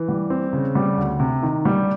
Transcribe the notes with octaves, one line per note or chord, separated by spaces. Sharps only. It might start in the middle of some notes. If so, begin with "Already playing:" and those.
Already playing: E3
G3
C4
C#3
G3
D2
C3
D#3
G3